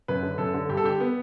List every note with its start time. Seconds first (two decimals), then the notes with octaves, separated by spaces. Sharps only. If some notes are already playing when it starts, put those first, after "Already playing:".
0.08 F#2 B4
0.23 D3
0.38 F#2 A4
0.54 D3
0.69 G2 G4
0.77 A4
0.84 D3 G4
1.00 B3